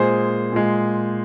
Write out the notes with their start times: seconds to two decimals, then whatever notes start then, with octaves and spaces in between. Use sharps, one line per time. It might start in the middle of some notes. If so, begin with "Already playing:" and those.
Already playing: A#2 G#3 G#4 C5
0.52 A#2 G#3